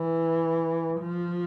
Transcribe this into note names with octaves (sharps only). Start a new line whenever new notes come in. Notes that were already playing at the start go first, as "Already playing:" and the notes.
Already playing: E3
F3